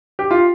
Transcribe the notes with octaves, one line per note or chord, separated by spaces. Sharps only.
G4
F4